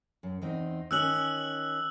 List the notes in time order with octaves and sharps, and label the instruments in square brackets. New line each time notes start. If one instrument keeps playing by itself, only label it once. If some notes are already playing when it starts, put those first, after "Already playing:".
[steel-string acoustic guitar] F#2
E2 C4 D#4
[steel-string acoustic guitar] D#3 C#4 [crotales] E6 F#6 F#7